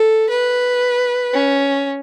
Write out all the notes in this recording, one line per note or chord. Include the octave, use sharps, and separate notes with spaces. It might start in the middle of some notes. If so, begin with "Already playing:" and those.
Already playing: A4
B4
C#4